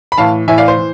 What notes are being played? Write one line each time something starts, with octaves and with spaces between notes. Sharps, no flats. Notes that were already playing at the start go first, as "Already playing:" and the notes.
B5
A2 E3 F5 A5
A2 E3 E5 G#5
D5 F5
C5
E3